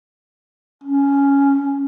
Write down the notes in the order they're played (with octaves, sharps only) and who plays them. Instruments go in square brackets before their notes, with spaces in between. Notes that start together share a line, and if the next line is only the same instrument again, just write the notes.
[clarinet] C#4